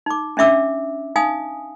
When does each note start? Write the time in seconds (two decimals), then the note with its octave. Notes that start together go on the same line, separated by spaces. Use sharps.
0.06 D#4 D6
0.37 C#4 D4 E5 D6 E6
1.16 D#4 F5 G#5 D#6